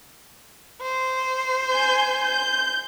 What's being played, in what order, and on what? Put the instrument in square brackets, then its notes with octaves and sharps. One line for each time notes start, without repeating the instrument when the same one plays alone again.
[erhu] C5
[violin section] G#5 G6
G6